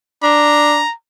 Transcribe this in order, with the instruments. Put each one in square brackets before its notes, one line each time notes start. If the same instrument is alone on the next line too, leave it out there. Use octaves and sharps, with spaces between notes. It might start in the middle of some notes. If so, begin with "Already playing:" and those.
[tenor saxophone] D4 [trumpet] A#5